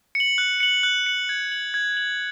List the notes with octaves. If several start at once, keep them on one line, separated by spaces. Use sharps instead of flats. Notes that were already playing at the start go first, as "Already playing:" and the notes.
C#7
F#7
F#6
C#7 F#7
F#6
C#7 F#7
G#6
F#7
G#6
F#7